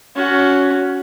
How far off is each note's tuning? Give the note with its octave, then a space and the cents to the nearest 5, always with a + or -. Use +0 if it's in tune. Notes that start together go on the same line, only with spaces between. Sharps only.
C#4 +15 F#4 +0